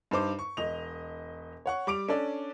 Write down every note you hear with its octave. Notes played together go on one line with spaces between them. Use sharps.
G2 D#4 C5 D6
C#6
E1 D#5 F7
C#5 F#5 C#6
G3 D6 D7 F7
C#4 D4 A4 D5